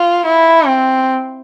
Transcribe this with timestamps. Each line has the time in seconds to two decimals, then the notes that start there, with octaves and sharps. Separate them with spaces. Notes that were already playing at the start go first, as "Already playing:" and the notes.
Already playing: F4
0.25 E4
0.67 C4